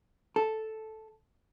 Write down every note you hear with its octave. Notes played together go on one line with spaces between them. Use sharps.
A4